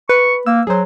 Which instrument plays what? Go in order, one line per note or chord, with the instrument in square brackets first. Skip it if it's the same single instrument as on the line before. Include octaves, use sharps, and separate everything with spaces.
[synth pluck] B4 [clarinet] C#6
[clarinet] A#3 [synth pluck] E6
[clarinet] F#3 [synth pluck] G#4 C5